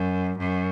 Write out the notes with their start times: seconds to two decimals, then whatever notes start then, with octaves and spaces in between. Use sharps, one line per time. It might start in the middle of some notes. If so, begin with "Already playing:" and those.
Already playing: F#2
0.38 F#2